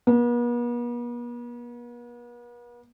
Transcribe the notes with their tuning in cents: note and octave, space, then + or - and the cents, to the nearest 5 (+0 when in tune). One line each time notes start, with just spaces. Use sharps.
B3 -45